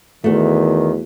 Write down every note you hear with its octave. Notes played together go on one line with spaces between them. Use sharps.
E2 D#3 A3 F#4